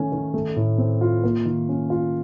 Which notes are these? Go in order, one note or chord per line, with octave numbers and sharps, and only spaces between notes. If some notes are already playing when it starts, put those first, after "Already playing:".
Already playing: D#3 A3 C#4
D#3
A3
A2
C4
F4
A#3
D#3
C#4
F4